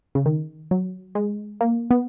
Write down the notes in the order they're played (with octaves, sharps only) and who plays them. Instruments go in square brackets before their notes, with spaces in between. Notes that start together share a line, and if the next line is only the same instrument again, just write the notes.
[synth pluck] C#3
D#3
F#3
G#3
A#3
B3